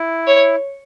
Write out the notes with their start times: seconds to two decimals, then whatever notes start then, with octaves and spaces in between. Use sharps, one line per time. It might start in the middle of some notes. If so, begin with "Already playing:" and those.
Already playing: E4
0.27 C#5